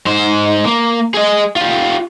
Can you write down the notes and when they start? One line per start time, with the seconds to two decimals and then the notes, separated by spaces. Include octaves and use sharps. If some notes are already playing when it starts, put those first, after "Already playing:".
0.06 G#2 C5
0.65 A#3
1.14 G#4 D#5
1.56 F4 G4